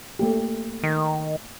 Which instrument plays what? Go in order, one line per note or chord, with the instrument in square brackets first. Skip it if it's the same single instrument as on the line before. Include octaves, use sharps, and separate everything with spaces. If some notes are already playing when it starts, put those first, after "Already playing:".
[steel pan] A3 A#3 G4
[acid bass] D#3